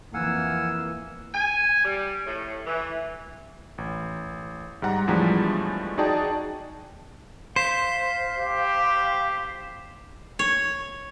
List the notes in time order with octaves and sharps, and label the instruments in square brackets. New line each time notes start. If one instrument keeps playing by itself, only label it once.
[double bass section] F2 E3 A#3 [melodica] F5 F#5 G#5 [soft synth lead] E6
[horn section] G#5
G3
A2
E3
[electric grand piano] A1
G#2 G3 F#5 A#5
E2 A2 F3 G3 G#3 D4
D#4 F#4 G#4 D5 G5 A5
[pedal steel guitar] C5 [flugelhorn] F5 [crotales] B6 C7 E7
[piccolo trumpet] G4
[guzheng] C#5